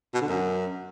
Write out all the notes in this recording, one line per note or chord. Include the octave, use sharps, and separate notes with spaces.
B2
D3
F#2